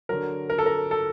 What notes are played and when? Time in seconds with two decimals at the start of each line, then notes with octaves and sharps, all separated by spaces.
0.09 D3 F#3 A#4
0.50 A#4
0.58 A4
0.66 A#4
0.91 A4